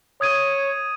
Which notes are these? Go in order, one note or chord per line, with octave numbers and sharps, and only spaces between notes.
C#5 D#6 G#6 D#7